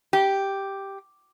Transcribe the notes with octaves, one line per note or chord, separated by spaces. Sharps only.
G4